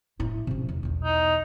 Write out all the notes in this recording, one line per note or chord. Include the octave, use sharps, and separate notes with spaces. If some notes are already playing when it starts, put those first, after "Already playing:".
A2 E4
C3 C#4
E2
B1 E2
D#4